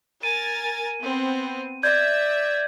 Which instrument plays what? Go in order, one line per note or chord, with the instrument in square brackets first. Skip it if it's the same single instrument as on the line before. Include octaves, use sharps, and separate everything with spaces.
[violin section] A#4 G#5 A6 [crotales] D#7
[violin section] B3 C4
[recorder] D5 [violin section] E5 [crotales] G6 G#6